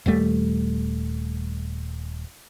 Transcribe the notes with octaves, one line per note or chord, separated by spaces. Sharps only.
D#1 D#2 G3 A3